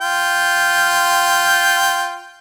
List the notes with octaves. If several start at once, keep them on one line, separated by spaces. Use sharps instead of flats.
F4 G5